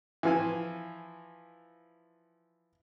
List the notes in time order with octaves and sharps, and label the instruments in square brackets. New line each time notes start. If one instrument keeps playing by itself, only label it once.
[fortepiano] E3 F3 G#5